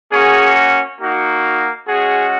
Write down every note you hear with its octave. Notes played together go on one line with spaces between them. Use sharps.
A#3 C#4 F#4 G#4
A#3 D#4 F#4
G#3 C#4 F#4 G#4